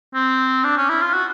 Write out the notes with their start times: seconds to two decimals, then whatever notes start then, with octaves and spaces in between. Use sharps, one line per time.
0.15 C4
0.64 D4
0.77 C#4
0.90 E4
1.02 F4
1.13 F#4